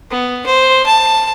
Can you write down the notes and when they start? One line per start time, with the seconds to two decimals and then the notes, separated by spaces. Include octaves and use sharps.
0.11 B3
0.46 C5
0.86 A5